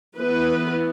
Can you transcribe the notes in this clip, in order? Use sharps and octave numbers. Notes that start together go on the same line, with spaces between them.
E3 B3 B4